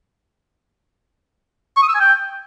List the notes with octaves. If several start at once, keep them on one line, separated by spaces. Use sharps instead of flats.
C#6
D#6
E6
G#5
G5